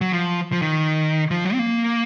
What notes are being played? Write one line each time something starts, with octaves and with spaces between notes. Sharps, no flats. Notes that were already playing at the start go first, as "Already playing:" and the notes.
F#3
F3
F3
D#3
F3
F#3
C4
A#3